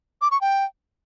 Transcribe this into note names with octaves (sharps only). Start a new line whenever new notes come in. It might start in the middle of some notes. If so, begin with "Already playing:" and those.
D6
C#6
G5